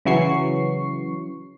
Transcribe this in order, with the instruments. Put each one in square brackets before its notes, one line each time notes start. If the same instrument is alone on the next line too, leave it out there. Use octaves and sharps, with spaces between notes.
[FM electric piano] C#3 E3 F#3 C#6 C7